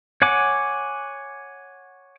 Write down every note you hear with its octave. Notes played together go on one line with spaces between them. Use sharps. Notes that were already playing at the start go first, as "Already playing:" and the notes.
C#5 F#5 G#5 D6